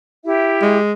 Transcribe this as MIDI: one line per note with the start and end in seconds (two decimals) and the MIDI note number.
0.24 0.79 64
0.24 0.79 67
0.24 0.79 76
0.62 0.93 56